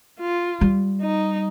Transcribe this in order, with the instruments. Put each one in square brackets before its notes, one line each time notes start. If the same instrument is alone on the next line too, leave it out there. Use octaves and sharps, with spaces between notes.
[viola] F4
[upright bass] G3
[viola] D#4